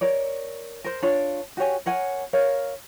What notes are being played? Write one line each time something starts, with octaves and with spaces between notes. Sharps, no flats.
A#4 C#5 D5
A#4 C5
D4 F4 C#5
F#4 G4 C#5 G#5
A#4 C#5 F#5 G#5
A#4 C#5 F5